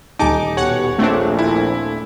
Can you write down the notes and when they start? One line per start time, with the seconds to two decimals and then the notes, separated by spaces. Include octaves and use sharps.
0.19 D#1 D2 D#4 G#5 A5 D6
0.57 B2 G4 C#5 F#5
0.99 A#1 A3 C4 D4
1.39 E4